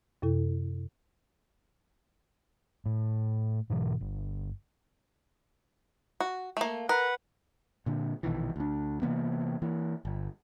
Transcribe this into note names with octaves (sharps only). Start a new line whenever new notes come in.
F#2 C3 E4 A4
A2
G#2 B2 E3
G1
F#4
A3 A#3
A#4 B4 F#5
A#2 D3
A#1 B2 D#3 E3
D2 D4
C3 E3 A#3 B3
E3 A#3
G1